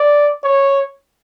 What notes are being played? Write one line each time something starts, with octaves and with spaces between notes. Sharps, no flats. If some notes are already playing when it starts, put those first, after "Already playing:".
Already playing: D5
C#5